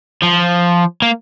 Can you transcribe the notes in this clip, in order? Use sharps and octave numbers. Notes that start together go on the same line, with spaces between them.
F3
A#3